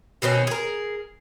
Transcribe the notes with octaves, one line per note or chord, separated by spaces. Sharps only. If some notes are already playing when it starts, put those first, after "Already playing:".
B2 D#3 C4 C#4
G#4 A#4